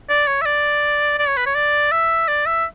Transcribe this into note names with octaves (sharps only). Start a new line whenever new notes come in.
D5
C#5
E5
D5
D5
C#5
B4
C#5
D5
E5
D5
E5